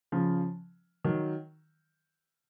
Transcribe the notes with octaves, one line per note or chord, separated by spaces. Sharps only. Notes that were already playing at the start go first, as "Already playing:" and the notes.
C#3 F3
D#3 F#3